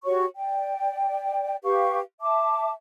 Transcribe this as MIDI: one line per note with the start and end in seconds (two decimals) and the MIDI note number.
0.04 0.24 66
0.04 0.24 67
0.04 0.24 73
0.04 0.24 85
0.35 1.55 74
0.35 1.55 79
1.63 2.00 67
1.63 2.00 71
1.63 2.00 77
1.63 2.00 85
2.21 2.71 76
2.21 2.71 81
2.21 2.71 86